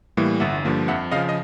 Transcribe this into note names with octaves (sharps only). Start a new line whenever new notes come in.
A2 E3 G3 A#3
G1 E5 F#5
G2 D3 F3 A#3
F2 E5 F#5
C#3 F3 D#5 F5
D#5